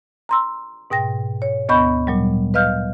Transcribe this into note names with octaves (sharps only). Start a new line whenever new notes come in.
A#5 C6 E6
G#2 B2 G5 A#6
C#5
D2 B3 D#5 B5 C#6 G6
A#2 F#3 G3
B4 D#5 F5 F6 G6